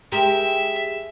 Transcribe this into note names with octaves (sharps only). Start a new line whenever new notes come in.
G#3 G4 A#4 E5